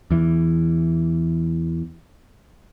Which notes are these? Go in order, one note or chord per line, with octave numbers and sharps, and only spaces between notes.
E2 E3